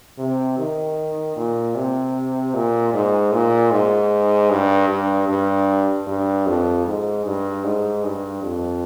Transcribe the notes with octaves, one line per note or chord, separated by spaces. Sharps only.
C3
D#3
A#2
C3
A#2
G#2
A#2
G#2
G2
G2
G2
G2
F2
G#2
G2
G#2
G2
F2